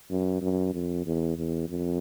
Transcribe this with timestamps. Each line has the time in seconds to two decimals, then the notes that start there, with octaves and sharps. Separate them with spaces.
0.11 F#2
0.41 F#2
0.73 F2
1.06 E2
1.38 E2
1.69 F2